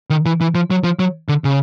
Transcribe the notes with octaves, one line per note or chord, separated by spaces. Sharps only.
D#3
E3
E3
F3
F#3
F3
F#3
D3
C#3